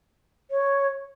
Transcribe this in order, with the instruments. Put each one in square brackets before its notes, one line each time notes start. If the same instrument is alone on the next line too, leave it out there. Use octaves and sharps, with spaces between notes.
[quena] C#5